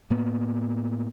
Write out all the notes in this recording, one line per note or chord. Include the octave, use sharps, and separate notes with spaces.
A2 A#3 B3